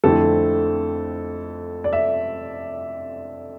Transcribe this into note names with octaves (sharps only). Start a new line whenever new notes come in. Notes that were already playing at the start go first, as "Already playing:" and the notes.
F2 D3 A3 C4 E4 A4
D5
E5